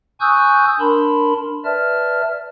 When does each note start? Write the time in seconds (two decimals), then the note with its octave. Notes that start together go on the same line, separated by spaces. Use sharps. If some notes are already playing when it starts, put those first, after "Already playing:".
0.20 G#5 C#6 D#6 E6 F#6 G6
0.80 D4 A#4 A5 B5 C6
1.65 B4 D5 E5 A5 F6